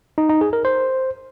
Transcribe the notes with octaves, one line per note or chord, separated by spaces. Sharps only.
D#4
D#4
G#4
A#4
C5